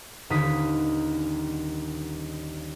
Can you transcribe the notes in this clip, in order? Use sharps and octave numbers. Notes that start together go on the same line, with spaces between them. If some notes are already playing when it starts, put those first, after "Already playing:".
D#1 D#2 D3 D#3 D#6 B6